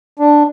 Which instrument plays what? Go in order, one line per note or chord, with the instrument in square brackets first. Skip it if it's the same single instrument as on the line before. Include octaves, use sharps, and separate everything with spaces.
[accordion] D4